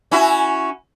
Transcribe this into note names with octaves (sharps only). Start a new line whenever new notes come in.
C#4 E4 F#4